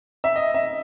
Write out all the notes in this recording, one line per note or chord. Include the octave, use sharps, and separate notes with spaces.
E5
D#5
E5